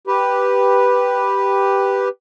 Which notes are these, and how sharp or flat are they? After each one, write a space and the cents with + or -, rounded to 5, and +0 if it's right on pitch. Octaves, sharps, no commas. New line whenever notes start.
G4 +0 B4 -5